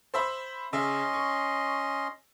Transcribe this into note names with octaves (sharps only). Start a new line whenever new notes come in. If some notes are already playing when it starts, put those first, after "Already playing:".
C5 E5 B5
C#3 C#4 D#5 E5 C6
C#6